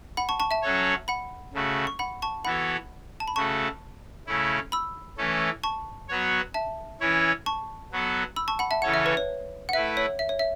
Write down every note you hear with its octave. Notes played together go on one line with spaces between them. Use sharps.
F#5 B5
A5 C#6
A5 C#6
E5 A5
F#3 C#4 F#4 A4 C#5
F#5 B5
C#3 A3 F#4
C#6
F#5 B5
A5 C#6
E3 B3 F#4 A4 C#5 F#5 B5
A5
B5
C#3 A3 F#4 A4 A5 C#6
C#3 A3 C#4 E4
B5 E6
E3 A3 C#4 A4
A5 C#6
F#3 B3 F#4 C#5
E5 A5
E3 C#4 E4 C#5
A5 C#6
F#3 B3 F#4 A4
B5 E6
A5 C#6
F#5 B5
E5 A5
C#3 E3 C#4 A4 C#5 F#5
E5
B4
C#5
F#5
A3 E4 B4 E5
C#5
E5
C#5
E5